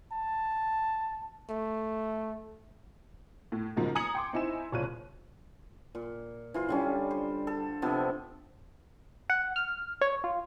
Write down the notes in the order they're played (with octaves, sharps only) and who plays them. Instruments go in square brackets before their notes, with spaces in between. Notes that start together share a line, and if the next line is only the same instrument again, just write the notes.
[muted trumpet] A5
A3
[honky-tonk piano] A2
G#2 C#3 F3 F#3 A#3
G#5 A#5 D#6 G#6 C#7 F#7
G5 C6 D6
C4 D#4 E4 G#5 E7
F#1 C2 F4 C#5 F#6 D#7
[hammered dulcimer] A#2
E3 F4 C5
D3 G3 C#4
C5
A4
C3 F3 B3 D4
[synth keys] F#5
F6
C#5
F4